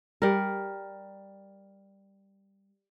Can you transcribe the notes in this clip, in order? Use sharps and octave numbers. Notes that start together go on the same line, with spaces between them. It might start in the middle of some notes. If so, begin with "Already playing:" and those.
G3 A#4